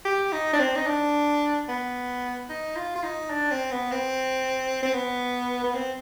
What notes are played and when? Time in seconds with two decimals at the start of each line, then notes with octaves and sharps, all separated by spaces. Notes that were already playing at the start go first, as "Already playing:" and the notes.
0.05 G4
0.32 D#4
0.53 D4
0.59 C4
0.76 D#4
0.87 D4
1.69 B3
2.50 D#4
2.76 F4
2.95 F4
3.03 D#4
3.30 D4
3.51 C4
3.71 B3
3.92 C4
4.83 C4
4.94 B3
5.63 B3
5.74 C4